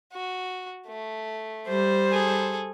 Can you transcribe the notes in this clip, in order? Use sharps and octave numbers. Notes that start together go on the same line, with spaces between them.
F#4
A3
G3 C5
G#4 A4